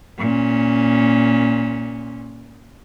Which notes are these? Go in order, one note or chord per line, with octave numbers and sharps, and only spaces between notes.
A#2 C#4